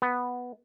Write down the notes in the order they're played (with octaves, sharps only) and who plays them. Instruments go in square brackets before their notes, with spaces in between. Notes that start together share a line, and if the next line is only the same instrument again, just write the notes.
[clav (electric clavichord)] B3